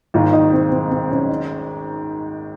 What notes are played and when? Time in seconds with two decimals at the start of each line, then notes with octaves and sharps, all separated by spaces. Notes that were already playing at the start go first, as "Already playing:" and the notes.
0.14 G#1 G#2 D#3 A#3 F4
0.33 D#4
0.53 C4
0.72 C4
0.91 C4
1.11 C#4
1.29 D#4